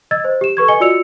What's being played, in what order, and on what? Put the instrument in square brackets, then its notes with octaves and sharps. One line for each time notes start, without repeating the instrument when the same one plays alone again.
[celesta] D#5 E6 G#6 A6
C5
G4 E7
A4 B4 C#6 G#6
D#5 G#5 C#7 G7
F4 F#4 D5 E6 C#7 F7